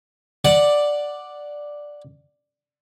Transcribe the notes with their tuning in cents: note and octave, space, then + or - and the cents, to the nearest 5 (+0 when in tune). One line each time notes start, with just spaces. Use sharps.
D5 +0 F#5 +0